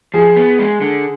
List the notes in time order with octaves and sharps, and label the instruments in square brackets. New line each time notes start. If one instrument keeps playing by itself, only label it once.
[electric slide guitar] F3 [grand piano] G#4
[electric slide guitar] B3
G#3
D3